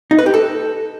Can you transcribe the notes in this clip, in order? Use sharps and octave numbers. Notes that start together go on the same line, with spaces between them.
D#4
B4
G4
A4